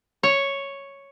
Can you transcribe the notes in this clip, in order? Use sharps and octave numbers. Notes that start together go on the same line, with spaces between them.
C#5